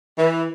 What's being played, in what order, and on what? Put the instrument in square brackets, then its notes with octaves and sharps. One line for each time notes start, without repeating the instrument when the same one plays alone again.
[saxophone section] E3